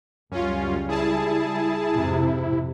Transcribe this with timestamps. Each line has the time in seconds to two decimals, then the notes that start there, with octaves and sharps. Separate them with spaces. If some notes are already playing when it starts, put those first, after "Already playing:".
0.32 C#2 F#2 G3 C#4 F4
0.89 E4 G#4 A5
1.92 F2 G#2 C3